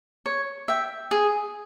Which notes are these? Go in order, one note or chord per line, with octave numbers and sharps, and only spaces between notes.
C#5
E5 G5
G#4